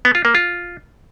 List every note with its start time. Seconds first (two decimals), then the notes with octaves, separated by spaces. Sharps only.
0.05 B3
0.15 F4
0.25 A#3
0.35 F4